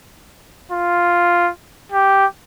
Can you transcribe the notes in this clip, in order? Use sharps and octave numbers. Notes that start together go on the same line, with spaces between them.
F4
G4